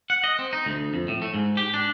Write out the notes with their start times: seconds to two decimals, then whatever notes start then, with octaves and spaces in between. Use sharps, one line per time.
0.10 F#5
0.24 D#5
0.39 C4
0.53 D#4
0.66 D2
0.94 F2
1.08 A2
1.22 A3
1.34 G#2
1.57 G4
1.74 D4